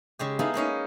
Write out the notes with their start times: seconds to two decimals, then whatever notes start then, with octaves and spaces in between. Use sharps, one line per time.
0.19 C#3 G#3 G4
0.39 B3 D#4 E4 G#4 A4 F5
0.54 G#3 A#3 C#4 D#4